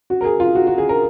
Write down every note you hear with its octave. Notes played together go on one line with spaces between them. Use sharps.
F#4
A#4
G#4
F4
F#4
F#4
G#4
A#4